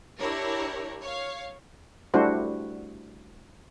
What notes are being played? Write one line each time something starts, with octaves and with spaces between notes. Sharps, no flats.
D4 E4 G4 A#4 C#5
C#5 F5
G3 A3 D4 E4 F#4 C5